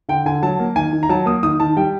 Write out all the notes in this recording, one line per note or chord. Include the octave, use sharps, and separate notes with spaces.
D3 G5
D3 G#5
F#3 A5
A#3
D#3 G#5
D#3
A#5
F#3 A5
A#3 D#6
D#3 D#6
D#3 A5
G3 G5